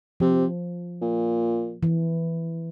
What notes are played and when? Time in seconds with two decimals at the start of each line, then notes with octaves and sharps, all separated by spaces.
0.20 C3 F3
1.02 A#2
1.83 E3